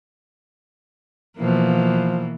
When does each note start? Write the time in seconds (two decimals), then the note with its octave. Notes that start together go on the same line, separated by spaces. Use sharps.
1.37 B2 E3 F3 A#3